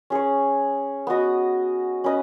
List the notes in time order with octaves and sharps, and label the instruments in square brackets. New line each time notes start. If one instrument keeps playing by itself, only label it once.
[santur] C#4 G#4 C#5
B3 F#4 D#5
C#4 B4 D#5